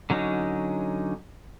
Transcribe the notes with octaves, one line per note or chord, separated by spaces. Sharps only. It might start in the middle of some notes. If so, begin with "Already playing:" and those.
D3 F#3 C#4 D#4